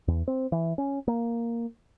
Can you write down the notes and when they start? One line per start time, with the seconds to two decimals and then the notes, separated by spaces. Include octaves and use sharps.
0.08 E2
0.28 C4
0.52 E3
0.78 C#4
1.08 A#3